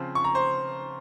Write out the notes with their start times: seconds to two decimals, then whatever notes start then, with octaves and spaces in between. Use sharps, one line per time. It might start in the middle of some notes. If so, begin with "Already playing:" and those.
Already playing: C#3 F3 C4
0.15 C#6
0.24 A#5
0.35 C5